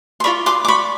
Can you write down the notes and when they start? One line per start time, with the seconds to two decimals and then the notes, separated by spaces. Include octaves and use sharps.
0.20 C6
0.24 F4 A#4 D5 B5 C#6
0.46 C6 D6
0.65 D6
0.68 B5 C#6